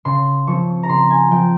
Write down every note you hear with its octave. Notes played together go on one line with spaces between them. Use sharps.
C#3 C6
F3 C4 C#6
A#5
C#3 C6
G#5
F3 C4 G5